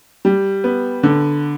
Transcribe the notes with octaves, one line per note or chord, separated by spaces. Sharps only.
G3
B3
D3